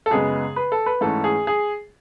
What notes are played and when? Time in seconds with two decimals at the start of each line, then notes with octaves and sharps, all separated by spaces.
0.06 A4
0.10 F#2 C#3 G#3 B3 G#4
0.56 B4
0.72 A4
0.86 B4
1.01 G#2 E3 A3 C#4 A4
1.24 G#4
1.47 G#4